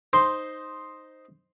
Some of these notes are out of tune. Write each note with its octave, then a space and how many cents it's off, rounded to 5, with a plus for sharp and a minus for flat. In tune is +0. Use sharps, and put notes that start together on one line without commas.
D#4 +0 C5 +0 C6 +5